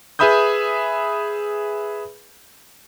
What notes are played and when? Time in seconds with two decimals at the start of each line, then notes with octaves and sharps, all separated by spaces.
0.19 G#4 B4 E5 B5 D#6 G6